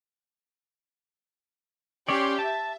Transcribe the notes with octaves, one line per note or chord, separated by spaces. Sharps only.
C#4 G4 C#5 D5 C6
E5 A5